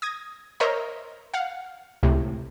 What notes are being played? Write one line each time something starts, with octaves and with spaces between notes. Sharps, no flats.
D#6 G#6 A#6
A#4 C5 C#5 D#5 E5 A#5
F5 F#5
C#2 A2 C3